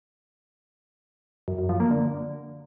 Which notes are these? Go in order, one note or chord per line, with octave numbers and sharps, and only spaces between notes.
F#2
F#2
F3
A#3
D3